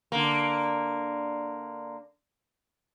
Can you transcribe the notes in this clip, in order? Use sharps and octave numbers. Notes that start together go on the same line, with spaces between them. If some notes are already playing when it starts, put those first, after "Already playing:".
D3 A#3